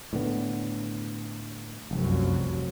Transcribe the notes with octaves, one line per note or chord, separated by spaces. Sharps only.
A2 D3 B3
F1 C2 F#2 F#3